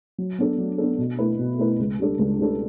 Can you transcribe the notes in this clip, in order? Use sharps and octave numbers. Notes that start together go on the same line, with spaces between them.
F#3
B3 D4 A4
F#3
B3 D4 A4
B2
A3 E4 B4
B2
A3 E4 B4
C#2
C#3 G3 D4 A4
C#2
C#3 G3 D4 A4